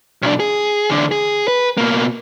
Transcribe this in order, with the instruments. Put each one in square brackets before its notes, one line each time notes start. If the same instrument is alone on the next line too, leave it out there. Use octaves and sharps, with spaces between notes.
[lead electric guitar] B1 D4
G#4
E2 D3
G#4
B4
B2 A#3